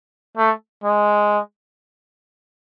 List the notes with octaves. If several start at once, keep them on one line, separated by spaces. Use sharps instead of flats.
A3
G#3